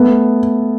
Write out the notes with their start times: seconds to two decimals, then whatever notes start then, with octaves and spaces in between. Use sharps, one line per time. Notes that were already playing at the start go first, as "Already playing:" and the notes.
Already playing: A3 B3